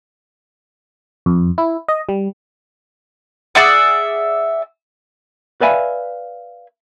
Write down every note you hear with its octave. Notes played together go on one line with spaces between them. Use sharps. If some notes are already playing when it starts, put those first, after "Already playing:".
F2
E4
D#5
G3
G#4 D5 E5 F#5
B4 D5 E5 F5 G#5 B5